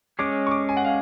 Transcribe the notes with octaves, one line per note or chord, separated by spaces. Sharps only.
G#3 C#4 G#4 C#5 D6
C#6
D6
G#5
F#5
F5